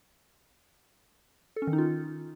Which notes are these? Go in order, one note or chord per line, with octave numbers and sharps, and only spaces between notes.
A4
C#4
D#3
D#4
F4